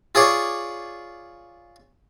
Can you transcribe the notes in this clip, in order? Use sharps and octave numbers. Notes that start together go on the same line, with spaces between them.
F4 G#4 C#5 D5